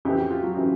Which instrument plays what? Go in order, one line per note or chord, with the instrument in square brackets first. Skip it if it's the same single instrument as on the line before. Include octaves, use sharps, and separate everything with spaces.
[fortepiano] F2 C#3 E3 [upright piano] G4
[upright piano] F#4
F4
F#3 F#4
[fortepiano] C#3 E3